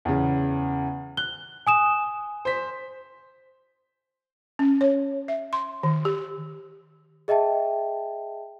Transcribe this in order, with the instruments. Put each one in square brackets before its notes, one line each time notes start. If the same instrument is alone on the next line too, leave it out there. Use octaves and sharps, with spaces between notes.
[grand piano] E2 C#3
[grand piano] F#6 [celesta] G7
[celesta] G#5 D#6 E7
[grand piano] C5 B6
[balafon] C#4
C#5
E5
C6
D#3
G4
[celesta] G#4 D#5 E5 G5 A5